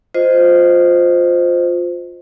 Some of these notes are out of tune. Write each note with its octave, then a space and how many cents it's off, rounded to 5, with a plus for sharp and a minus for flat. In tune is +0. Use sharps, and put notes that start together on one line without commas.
F4 +15 C5 -15 D#5 +0